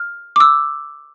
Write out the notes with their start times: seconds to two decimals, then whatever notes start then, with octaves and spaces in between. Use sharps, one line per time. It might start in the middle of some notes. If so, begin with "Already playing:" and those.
Already playing: F6
0.36 D6
0.40 E6